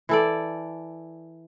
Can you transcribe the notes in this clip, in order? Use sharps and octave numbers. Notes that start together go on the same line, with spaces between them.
E3 A4 D5